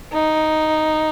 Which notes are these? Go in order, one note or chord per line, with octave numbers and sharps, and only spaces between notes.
D#4